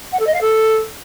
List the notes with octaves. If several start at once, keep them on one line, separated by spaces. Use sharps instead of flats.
F#5
A4
D#5
F5
A4